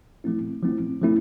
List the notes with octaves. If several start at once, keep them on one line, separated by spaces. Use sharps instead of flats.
F3 A3 C4 E4
F3 A3 C4 E4
F3 A3 C4 E4